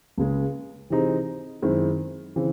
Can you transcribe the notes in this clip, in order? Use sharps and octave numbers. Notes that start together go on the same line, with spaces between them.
C#2 C#3 G#3
C3 E3 C4 D#4 G#4
F#2 D#3 G#3 C4 E4
C#3 E3 C4